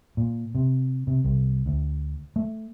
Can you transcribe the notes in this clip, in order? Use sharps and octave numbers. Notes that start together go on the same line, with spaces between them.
A#2
C3
C3
C2
D2
A3